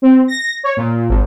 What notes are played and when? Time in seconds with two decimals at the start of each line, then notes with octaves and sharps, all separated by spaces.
0.02 C4
0.28 A#6
0.64 C#5
0.77 A#2
1.09 G#1